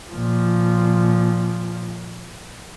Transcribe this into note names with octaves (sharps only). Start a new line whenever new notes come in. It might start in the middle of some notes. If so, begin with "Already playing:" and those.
A#2 F3